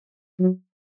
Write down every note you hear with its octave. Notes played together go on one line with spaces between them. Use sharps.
F#3